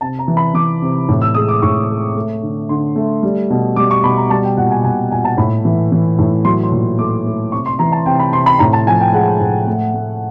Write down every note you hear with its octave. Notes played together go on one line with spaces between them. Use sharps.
C3 A5
A#5
E3
B5
E3 D6
C3
A2
E6
G#3 D#6
D6
A2 C#6
G#3
A3
D3
D3 C6
A3
G3
B2
G3 D6
C#6
B2 B5
A#5
G3 A5
G5
A#2 F#5
G#5
A#2 G#5
A#2 G#5
A5
A2 B5
E3
E3
A2
F#3 C6
C6
A#2
A3 D6
A3
C3 C#6
C6
E3 A#5
A5
C3 G5
B5
C3 C6
B5
A2 A#5
A5
F3 G#5
G5
G#3 F#5
A2
A3
A3